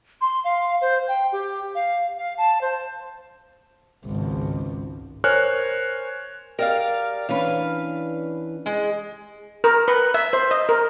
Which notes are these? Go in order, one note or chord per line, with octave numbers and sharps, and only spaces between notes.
C6
F5
C5
G5
G4
F5
F5
A5
C5
G#1 C#2
A#4 C5 C#5 G#5 F6 F#6
G4 G#4 A#4 D5 F5
E3 C#4 D4 B4 F5
G#3
A#4
B4
E5
C5
D#5
A#4